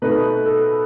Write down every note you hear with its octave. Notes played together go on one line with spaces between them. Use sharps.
B2 A3 D#4 B4
A4